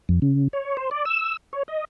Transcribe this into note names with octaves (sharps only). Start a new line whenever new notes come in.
F2
C#3
C#5
C5
D5
E6
C#5
D#5